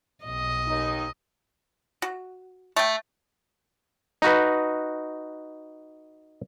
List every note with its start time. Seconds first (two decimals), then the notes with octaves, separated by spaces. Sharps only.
0.25 B1 D#5
0.68 D#2 D#4
2.02 F#4
2.76 A3 G5
4.22 D#4 F#4 B4